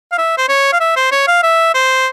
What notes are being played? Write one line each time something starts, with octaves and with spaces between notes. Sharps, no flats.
F5
E5
C5
C#5
F5
E5
C5
C#5
F5
E5
C5